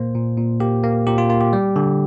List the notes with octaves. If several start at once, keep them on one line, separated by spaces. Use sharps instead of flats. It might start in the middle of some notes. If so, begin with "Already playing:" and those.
Already playing: A#2 A#3 C5
A#2
A#2
A#3 G4
A#3
A#2 G4
F4
A#3 F4
G4
G3
D3